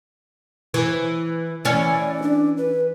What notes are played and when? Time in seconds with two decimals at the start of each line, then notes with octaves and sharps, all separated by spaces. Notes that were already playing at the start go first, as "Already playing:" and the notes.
0.74 E3
1.65 E3 C#4 D5
2.22 D4
2.57 B4